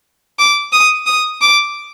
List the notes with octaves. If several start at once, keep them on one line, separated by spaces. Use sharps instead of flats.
D6
D#6
D#6
D6